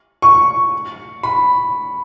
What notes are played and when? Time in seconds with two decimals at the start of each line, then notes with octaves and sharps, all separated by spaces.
0.22 C#6
1.23 B5